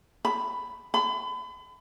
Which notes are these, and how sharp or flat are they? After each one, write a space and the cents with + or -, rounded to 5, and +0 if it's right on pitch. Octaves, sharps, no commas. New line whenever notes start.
B5 +10
B5 +35